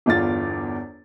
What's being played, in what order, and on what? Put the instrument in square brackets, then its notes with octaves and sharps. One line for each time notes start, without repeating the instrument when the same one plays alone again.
[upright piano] G1 E2 F4 A6